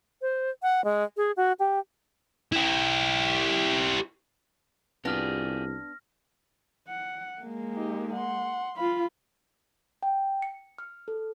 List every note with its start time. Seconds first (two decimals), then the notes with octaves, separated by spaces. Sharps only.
0.22 C5
0.62 F#5
0.84 G#3
1.17 G#4
1.37 F#4
1.59 G4
2.53 E4 G4
5.05 C2 B3 D4 F4 G4 G#4 F6 A#6
6.88 F#5
7.42 G#3 A#3
7.75 D#4 G4
8.12 F#5 C6
8.77 F4 F5 B5
10.03 G5
10.42 C#7
10.78 F6
11.08 A4